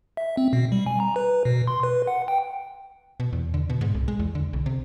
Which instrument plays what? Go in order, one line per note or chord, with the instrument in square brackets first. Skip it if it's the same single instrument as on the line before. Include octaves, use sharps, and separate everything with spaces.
[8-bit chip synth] E5
C4
B2
G3
G#5
A#5
B4
B2
C6
B4
F#5
G5
[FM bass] B2
E2
D3
B2
G#2
C2
G#3
E2
D3
B1
C3